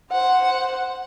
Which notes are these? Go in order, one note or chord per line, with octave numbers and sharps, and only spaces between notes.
C5 F#5